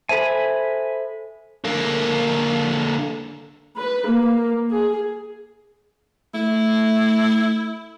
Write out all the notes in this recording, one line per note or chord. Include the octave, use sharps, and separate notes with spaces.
A4 C5 E5 G#5 B5
D3 A#3
B4
A#3
G#4
A3 E4